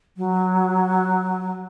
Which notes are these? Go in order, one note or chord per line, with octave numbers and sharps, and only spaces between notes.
F#3